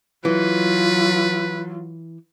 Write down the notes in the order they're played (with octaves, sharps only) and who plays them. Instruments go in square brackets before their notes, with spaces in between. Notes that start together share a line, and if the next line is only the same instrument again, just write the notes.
[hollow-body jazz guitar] E3 [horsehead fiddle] F#3 F4 [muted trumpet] B4